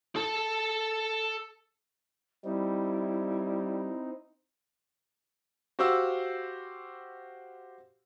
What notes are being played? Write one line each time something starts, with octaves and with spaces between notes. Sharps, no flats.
A4 A5
G3 C4 D#4 E4
F#4 G4 C5 F5 F#5 E6